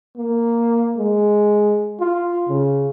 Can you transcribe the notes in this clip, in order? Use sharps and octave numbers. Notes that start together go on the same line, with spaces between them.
A#3
G#3
F4
C#3